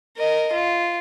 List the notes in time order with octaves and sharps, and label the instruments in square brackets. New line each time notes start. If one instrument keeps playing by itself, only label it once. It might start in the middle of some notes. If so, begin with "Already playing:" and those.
[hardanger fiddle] A#4 D#5
F4